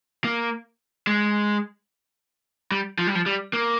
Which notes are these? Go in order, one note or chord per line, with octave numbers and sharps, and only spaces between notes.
A#3
G#3
G3
F3
G3
F3
G3
A#3